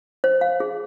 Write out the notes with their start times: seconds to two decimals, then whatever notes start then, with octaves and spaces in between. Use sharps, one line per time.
0.24 C5
0.41 F5
0.60 G#4